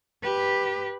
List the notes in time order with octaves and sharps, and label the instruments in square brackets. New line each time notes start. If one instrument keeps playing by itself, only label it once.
[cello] G4 B4